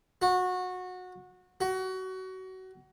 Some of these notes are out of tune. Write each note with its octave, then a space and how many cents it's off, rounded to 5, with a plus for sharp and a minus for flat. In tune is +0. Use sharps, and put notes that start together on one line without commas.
F#4 -20
F#4 +25